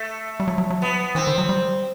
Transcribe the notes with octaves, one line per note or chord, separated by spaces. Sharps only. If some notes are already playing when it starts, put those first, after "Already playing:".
Already playing: A3
G3
F#3
F#3
F#3
B3
E3 C4
D#3
F#3
G3